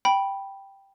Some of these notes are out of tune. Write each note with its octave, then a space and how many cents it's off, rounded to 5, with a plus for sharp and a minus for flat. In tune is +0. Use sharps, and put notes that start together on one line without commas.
G5 +0 B5 -10